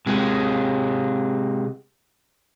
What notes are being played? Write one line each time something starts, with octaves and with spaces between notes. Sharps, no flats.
C3 G#3